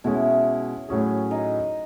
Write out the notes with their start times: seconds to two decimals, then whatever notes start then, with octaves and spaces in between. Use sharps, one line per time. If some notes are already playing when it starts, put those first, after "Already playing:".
0.04 B2 G#3 C#4 E4
0.89 A2 F#3 C#4 G#4
1.31 D#4